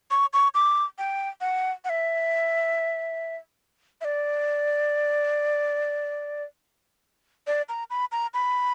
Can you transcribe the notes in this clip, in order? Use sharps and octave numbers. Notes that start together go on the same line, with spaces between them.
C#6
C#6
D6
G5
F#5
F#5
E5
E5
D5
D5
A#5
B5
A#5
B5